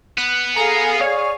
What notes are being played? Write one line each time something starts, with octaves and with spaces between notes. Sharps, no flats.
B3 F#6
G#4 A4 F5 A#5
C#5 D5